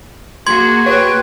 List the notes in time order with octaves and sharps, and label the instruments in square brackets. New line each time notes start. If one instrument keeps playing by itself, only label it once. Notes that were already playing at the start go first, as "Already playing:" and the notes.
[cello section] A#3 F#4 G#4 [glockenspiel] C6 G#6
[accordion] B4 G5 [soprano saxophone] C#5